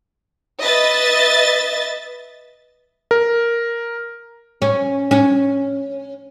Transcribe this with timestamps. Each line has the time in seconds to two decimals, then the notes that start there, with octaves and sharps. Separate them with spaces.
0.61 B4 D#5 E5 A6
3.11 A#4
4.62 C#4
5.11 C#4